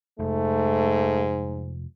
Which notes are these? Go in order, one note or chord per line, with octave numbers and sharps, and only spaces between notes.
F1 G#2 A3